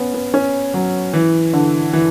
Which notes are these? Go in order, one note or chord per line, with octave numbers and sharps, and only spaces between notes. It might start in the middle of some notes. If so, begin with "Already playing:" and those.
Already playing: B3 C#4
B3
C#4
F#3
E3
D3
E3